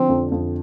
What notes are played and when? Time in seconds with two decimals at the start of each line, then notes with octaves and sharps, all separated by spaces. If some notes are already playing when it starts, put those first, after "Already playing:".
Already playing: D3 F3 C4
0.09 F2
0.32 F2